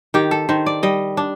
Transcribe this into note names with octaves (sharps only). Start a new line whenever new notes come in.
D#3 G4
A4
D#3 C5
D5
G3 D#5
D4